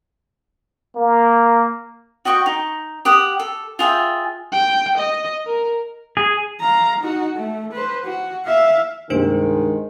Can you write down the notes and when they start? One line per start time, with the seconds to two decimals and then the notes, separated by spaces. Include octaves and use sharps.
0.96 A#3
2.25 F#4 D#5 G5 C#6
2.46 D#4
3.05 G4 F#5 D#6
3.39 A4
3.79 F4 G#4 E5 G5
4.52 G5
4.98 D#5
5.46 A#4
6.17 G#4
6.61 F5 A#5
7.00 D#4 F#4
7.36 A3
7.73 B4 C5
8.05 F#4
8.45 E5 F5
9.10 C2 G2 D#3 G#3 D4 C5 D7